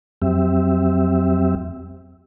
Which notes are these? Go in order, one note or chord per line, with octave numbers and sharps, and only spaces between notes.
F2 F#3 C4 G4 E5